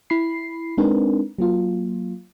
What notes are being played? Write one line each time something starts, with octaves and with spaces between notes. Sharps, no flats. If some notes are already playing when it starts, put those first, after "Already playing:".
E4 B5 C7
G#3 C4 D4 D#4 A#4 B4
F#3 A#3 F4